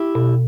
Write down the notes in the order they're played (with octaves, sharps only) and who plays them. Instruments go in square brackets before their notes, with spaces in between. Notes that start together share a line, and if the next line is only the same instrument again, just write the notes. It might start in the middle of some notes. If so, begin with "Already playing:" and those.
Already playing: [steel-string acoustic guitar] E4 G4
[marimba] B2